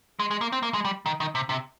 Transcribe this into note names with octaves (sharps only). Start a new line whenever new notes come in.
G#3
G#3
A#3
C4
A#3
G#3
G3
D#3
D#3
C3
C3